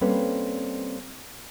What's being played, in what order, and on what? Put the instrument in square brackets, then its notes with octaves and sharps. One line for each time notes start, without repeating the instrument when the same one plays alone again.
[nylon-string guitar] G3 A#3 C4 C#4 A4 B4